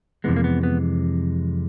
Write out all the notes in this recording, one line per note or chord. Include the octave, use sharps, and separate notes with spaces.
F2 C3 E3 G#3 B3
A#3
B3
B3